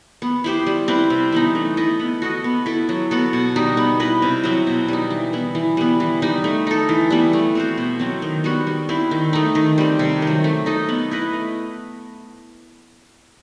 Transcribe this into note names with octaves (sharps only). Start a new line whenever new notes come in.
B3
E4 G4 C5
G3
C4 E4 B4
C3
E3 B3 D#4
A3
E4 A4 D#5
B3
F#4 A4 D#5
B3
E4 A4
F#3
B3 F#4 A4
B2
G3 D#4
B3
E4 B4 D#5
C3
F#3 C4 E4
B2
G3 D#4
E3
B3 E4
E3
G3 B3
E3
G3 D#4
A3
D#4 A4
E3
G3 B3 E4
A3
C4 F#4 C5
B2
F#3 A3 C4
D#3
G3 B3 F#4
G3
C4 E4
D#3
A3 D#4
D#3
G3 C4
C3
D#3
F#3
A3
D#4 A4 D#5
B3
E4 B4 D#5
A3